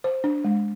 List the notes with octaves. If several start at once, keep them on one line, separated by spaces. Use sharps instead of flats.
C5
D4
G#3